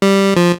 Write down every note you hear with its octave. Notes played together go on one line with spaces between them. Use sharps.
G3
F3